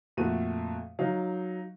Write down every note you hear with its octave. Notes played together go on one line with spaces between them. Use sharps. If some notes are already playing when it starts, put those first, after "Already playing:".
F2 A#2 A3 F#4 D#7
F#3 D#4 F5